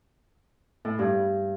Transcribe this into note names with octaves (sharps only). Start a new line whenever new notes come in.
A2
G2